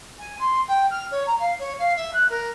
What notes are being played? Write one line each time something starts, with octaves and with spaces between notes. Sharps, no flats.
G#5
C6
G5
F6
C#5
A#5
F5
C#5
F5
E5
F#6
A#4